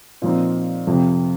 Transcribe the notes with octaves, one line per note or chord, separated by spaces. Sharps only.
A#2 F3 C4 D#4
F2 C3 F3